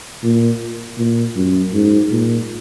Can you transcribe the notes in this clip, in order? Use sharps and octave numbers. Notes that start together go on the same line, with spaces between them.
A#2
A#2
F#2
G#2
A#2